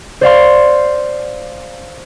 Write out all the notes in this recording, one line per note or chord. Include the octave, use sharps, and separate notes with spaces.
C5 D5 F5 C6